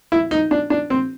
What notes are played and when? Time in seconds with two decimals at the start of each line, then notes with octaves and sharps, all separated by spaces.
0.12 E4
0.31 D#4
0.51 D4
0.70 D4
0.90 C4